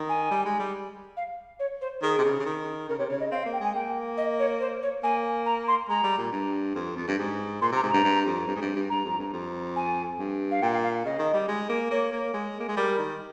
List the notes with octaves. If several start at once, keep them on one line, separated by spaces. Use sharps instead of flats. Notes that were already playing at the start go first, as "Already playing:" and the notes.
Already playing: D#3
G#5
G3
G#3
G3
F5
C#5
C5
D#3 G#4
C3
C#3
C#3
D#3
C#3 A#4
C3 C#5
C#3 C#5
D#5
C4 F5
F5
A#3
G5
G#3 G#5
A#3 G5
D#5
C#5
C5
C#5
A#3 G#5
A#5
C6
G#3 A#5
G3
A#2
G2
F2
F2
G2
G#2
A#2 C6
C3 A#5
G#2
G2 A#5
G2
F2
G2
G#2
G2
G2
G2 A#5
F2
G2
F2
G#5
G2
F5
A#2 G5
F5
F5
C#3 D#5
D#3
G3
G#3
A#3
A#3 C#5
A#3
G#3
A#3
G#3
G3 A#4
D#3